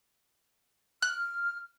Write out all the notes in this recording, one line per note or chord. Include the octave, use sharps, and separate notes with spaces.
F6 F#6